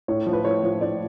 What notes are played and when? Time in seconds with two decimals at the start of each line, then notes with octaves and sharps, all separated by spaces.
0.08 A2 C#5
0.27 F3
0.33 B4
0.45 A2 C#5
0.63 F3
0.81 A2 D5